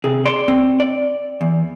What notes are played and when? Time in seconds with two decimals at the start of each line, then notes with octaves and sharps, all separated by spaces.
0.04 C3 G#4
0.25 D5 C6
0.48 C4
0.80 D5
1.41 E2